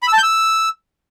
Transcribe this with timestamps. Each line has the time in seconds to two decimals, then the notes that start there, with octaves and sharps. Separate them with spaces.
0.03 B5
0.08 E6
0.13 A5
0.18 G6
0.23 E6